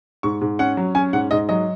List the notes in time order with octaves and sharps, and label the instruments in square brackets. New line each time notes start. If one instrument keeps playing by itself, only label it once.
[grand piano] G#2 C#6
G#2
C#4 F#5
F#3
C#4 G#5
G#2 F#5
G#2 D#5
F#3 D#5